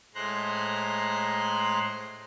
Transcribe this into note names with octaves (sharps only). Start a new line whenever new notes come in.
A2 G#3 C5 A#5 C6 F#6